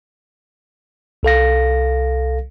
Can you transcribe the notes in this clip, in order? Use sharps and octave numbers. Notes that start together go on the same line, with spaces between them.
C2 A4 F5 A#6